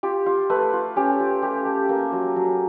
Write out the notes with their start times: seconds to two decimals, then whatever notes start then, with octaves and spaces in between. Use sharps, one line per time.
0.03 F4 G4
0.26 F4
0.50 A3 B4
0.73 F4
0.96 C#4 G4
1.20 F4
1.42 A3 G4
1.66 A3
1.89 A#3
2.12 F#3
2.36 F#3